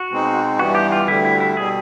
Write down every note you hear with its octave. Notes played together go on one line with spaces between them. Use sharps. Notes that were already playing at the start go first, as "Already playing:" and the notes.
Already playing: F#4
B2 G#3 C4 D#4
G2 E3 G3 B3 F#4
G4
F4
D2 D3 G3 E4
E4
E4
B2 G3 G#4